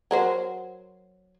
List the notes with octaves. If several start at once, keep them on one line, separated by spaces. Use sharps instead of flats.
F#3 A#4 C5